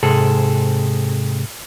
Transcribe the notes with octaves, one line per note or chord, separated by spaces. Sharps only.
G#2 C3 G#4 A4